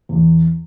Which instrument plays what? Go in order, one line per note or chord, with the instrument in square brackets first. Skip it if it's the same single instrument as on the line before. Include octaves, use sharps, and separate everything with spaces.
[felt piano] E2